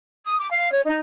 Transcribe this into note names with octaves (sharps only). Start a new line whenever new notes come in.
D#6
D6
F5
C#5
D#4